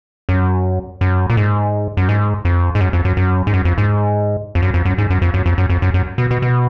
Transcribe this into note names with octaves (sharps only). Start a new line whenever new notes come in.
F#2
F#2
A#2
G#2
F#2
G#2
F2
G#2
F#2
F2
F#2
F#2
G#2
F#2
F2
G#2
F2
F#2
F2
F#2
G#2
F#2
F2
F#2
F2
F#2
F2
F#2
F#2
B2
B2
B2